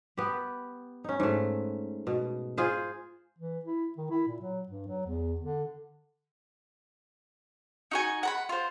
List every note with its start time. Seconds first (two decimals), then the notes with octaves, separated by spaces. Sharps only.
0.17 B3 G4
1.04 C#4 D#4
1.20 G#2 A3
2.07 B2
2.58 F4 G#4 C5
3.39 E3
3.65 E4
3.97 D#3
4.10 E4
4.27 A#2
4.41 F#3
4.68 G2
4.88 F#3
5.06 E2
5.40 D3
7.91 D#4 F#4 G#5
8.23 F#5 A#5 B5
8.49 F4 C5